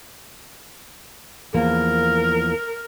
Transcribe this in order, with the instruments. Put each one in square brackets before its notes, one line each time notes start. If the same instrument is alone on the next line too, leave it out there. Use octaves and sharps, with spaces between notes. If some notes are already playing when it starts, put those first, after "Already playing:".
[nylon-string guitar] E2 F3 A#3 [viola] A#4